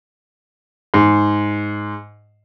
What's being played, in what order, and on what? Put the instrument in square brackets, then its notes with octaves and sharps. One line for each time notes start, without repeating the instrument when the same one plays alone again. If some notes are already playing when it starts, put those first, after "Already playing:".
[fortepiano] G#2